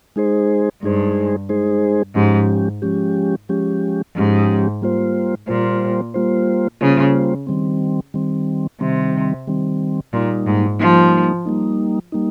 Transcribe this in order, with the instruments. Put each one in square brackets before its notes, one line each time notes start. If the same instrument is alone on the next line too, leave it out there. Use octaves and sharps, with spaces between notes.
[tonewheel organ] G#3 D#4 G#4 C5
[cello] G2 [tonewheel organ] G#3 D#4 G#4 C5
[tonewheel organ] G#3 D#4 G#4 C5
[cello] G#2 [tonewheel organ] F3 G#3 C#4 G4
[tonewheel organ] F3 G#3 C#4 G4
F3 G#3 C#4 G4
[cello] G#2 [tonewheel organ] F3 G#3 C#4 G4
[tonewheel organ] G3 A#3 F4 C5
[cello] A#2 [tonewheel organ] G3 A#3 F4 C5
[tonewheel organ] G3 A#3 F4 C5
[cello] C#3 [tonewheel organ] G3 A#3 F4 C5
[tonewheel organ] D#3 G3 C4
D#3 G3 C4
[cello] C3 [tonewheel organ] D#3 G3 C4
[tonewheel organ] D#3 G3 C4
[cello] A#2 [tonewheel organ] G3 A#3 D#4
[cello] G#2
[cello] F3 [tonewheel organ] G3 A#3 D#4
[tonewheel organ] G3 A#3 D#4
G3 A#3 D#4